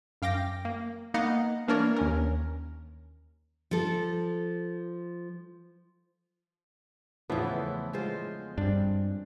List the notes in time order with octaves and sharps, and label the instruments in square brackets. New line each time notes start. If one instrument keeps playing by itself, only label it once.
[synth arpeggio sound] F#2 F5 G5 D6 A#6
A#3
A#3 B3 D#4 D#5 F5 F#5
E3 A#3 D4 A#4 C#5 D5
D#2 C#4 A#4
[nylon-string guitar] F3 A4
[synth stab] E2 A2 B3 [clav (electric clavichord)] C#3 E3 A3 [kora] F3 E4
[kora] G#3 F4 C5
[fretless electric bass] G2 [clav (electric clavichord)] C4 D4